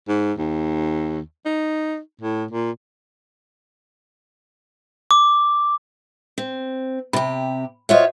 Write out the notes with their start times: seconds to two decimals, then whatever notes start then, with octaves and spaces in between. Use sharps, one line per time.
0.08 G#2
0.38 D#2
1.45 D#4
2.21 A2
2.51 A#2
5.11 D6
6.38 C4
7.13 C3 G4 B5
7.89 F4 F#4 C5 C#5 D#5 E5